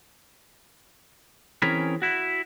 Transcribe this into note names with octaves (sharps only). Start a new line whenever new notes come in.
E3 C4 C#4 G#4 A#4 B5
E4 F#4